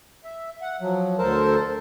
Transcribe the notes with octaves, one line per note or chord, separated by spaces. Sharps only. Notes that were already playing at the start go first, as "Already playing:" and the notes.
E5
F#5
F3 F#3
D2 A4 A#4 C5 A5